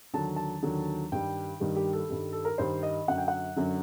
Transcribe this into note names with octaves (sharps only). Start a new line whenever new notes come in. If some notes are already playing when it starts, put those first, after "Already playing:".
D#2 D3 F#3 A5
A5
D#2 D3 F#3
G2 D#3 G3 G5
G2 D#3 G3
G4
A4
G2 D#3 G3
A4
A#4
G2 D#3 G3 C5
D#5
F#2 D3 F#3 F#5
G5
F#5
F#2 D3 F#3